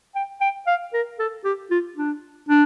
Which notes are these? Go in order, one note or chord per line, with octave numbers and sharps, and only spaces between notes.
G5
G5
F5
A#4
A4
G4
F4
D4
D4